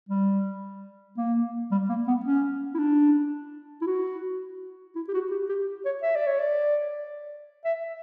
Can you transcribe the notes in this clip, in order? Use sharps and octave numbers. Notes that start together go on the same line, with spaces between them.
G3
A#3
G3
A#3
B3
C#4
E4
D4
E4
F#4
E4
G4
F#4
G4
G4
C#5
E5
D5
C#5
D5
E5